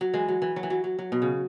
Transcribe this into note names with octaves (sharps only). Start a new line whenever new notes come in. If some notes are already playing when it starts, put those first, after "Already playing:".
F#3
E3 G#3
F#3
E3
F#3
E3
F#3
F#3
F#3
B2
C#3